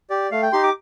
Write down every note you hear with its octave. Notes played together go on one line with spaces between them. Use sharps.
G4 D5
A3 F5
G5
D#4 G4 C6
D6